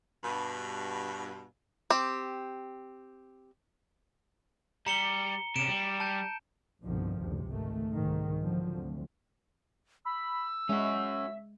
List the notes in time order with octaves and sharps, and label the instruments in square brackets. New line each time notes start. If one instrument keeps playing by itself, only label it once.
[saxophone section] G2 B2
[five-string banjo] C4 G4
[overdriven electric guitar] G3 [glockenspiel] A#5 C#7 G7
[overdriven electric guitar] C3 C#4 [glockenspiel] D7 E7
[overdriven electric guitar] G3
[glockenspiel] A5 G6
[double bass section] C2 G2 B2 D3 D#3 F3
F#1 D2 G2 C3
G#1 C#2 G#2 D#3 A3
C2 G#2 D#3
B2 D3 F3 F#3
D2 C3
[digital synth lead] B5 [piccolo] E6
[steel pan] G#3 [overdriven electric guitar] C#4 F#4 [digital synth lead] E5